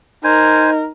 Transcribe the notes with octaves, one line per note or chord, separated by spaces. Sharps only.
D#4 A#4 C5 G#5